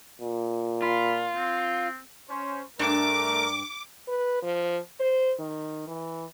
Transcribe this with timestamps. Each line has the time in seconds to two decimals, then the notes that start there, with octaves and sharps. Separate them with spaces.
0.21 A#2
0.82 F4 B5
1.36 C4
2.29 C#4 C5
2.79 G2 A3 D4 A#4 D6
4.08 B4
4.42 F3
5.00 C5
5.39 D#3
5.88 E3